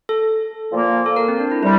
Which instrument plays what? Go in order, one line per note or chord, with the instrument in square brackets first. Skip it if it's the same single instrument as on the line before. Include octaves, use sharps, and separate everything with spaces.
[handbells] A4
[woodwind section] A#2 F3 A#3
[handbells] A4
A#4
C4
D4
E4
[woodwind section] C3 G3 [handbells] E4